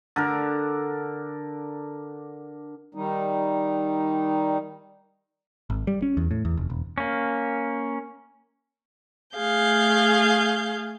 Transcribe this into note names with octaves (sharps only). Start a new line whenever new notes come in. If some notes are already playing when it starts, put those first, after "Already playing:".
D3 D4 A#4
D#3 G3 D#4
G#1
G3
C#4
E2
A2
E2
F1
E1
A#3 C#4
A3 G#4 F5 G6